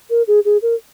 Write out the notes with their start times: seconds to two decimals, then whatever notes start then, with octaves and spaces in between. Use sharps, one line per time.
0.10 A#4
0.28 G#4
0.45 G#4
0.62 A#4